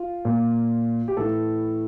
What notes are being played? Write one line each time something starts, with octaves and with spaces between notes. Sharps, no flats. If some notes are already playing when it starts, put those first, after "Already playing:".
Already playing: F4
A#2
G4
A2 E3 A4